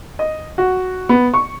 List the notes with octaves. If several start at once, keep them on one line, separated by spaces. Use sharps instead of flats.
D#5
F#4
B3
C#6